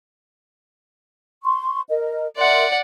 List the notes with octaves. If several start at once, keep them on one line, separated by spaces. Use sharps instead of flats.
C6 C#6
A#4 D#5
A#4 D5 E5 F#5 C6